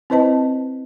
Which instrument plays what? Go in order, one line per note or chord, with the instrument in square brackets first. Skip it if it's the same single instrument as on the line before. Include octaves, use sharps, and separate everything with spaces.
[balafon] C4 E4 B4 C5 D#5 A5